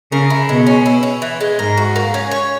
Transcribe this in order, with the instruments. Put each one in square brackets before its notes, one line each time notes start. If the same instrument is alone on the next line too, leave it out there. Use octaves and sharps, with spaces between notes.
[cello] C#3 [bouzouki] A#4
[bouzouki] E4
[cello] B2 [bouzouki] G#3
[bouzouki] C#4
E4
C#4
E3
G#3
[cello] G#2 [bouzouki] A#4
[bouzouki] F#4
A#3
C#4
C#5